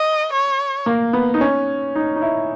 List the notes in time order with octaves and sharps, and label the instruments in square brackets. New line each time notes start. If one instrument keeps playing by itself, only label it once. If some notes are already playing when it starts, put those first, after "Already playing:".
Already playing: [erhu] D#5
C#5
[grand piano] A#3
B3
D#4
C#4
D#4
D#4
E4